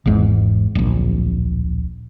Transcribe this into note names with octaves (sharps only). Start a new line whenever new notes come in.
G#1 E2 G#2
D1 A#1